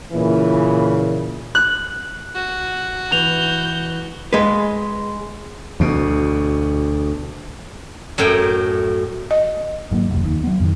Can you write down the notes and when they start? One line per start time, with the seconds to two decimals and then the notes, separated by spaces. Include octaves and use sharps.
0.12 A#2 C#3 E3
1.55 F#6
2.35 F#4
3.12 E3 G6 F7
4.33 G#3 B4
5.80 D2 B2
8.18 F#2 A2 G5 A#5
9.31 D#5
9.91 G#1 F#3 A#3
10.10 F1 D2
10.24 D#2
10.44 F#3 B3
10.60 F2 A2 D#3